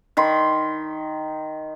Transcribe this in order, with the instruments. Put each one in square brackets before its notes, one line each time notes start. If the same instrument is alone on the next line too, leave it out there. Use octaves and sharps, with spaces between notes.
[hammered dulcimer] D#3 B5 C6